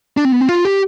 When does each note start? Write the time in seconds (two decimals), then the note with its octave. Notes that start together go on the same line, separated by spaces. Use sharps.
0.17 D4
0.25 C4
0.32 B3
0.40 C4
0.49 F4
0.65 G4